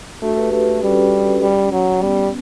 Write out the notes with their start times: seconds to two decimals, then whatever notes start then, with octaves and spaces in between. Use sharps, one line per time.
0.22 A3 D4 F#4
0.37 G4 B4
0.52 A3 G4 B4
0.67 F#4 A4
0.82 G3 C#4
1.42 G3
1.73 F#3
2.02 G3 B3